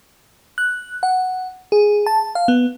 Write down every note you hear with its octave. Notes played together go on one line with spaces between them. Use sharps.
F#6
F#5
G#4
A5
F5
B3